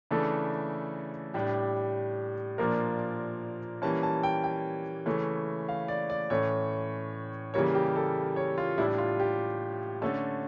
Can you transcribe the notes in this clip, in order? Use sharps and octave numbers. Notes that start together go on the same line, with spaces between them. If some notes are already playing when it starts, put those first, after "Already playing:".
C#3 E3 A3 D4 A4
A2 G3 D4 G4
A#2 F3 A#3 D4 A#4
E3 G3 A#3 C#4 A5
A5
G5
G5
C#3 E3 A3 C#4
F5
D5
D5
A2 E3 A3 C#4 C#5
C#3 E3 G3 A#3 C#5
G4
A4
C#5
F4
A2 G3 D4 E4
F4
G4
D3 A3 C#4 A4